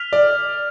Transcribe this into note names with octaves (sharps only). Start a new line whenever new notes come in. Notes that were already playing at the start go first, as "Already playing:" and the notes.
Already playing: F6 B6 F7
D5